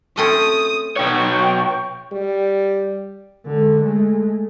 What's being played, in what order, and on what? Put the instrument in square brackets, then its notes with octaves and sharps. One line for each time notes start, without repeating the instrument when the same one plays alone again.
[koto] A3 C4 C#4 [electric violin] D#6
[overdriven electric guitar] B2 C#5 [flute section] G5 C#6
[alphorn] G3
[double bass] D3 G#3
G#3 A3